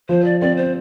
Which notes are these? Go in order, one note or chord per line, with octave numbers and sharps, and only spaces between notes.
F3 C5
D5
C4 D5
C5